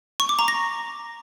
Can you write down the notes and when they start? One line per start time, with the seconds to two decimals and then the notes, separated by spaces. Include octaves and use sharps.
0.20 C#6
0.29 D6
0.39 A#5
0.48 A#6